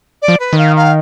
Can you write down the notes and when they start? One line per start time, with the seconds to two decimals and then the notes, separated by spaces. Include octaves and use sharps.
0.22 D5
0.28 F3
0.40 B4
0.53 D#3
0.58 F5
0.76 F5